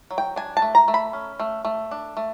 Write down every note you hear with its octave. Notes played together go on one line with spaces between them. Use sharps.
F#3
G5
D4 G#5
A5
A3
A#5
A3
B5
C#4
A3
A3
D4
A3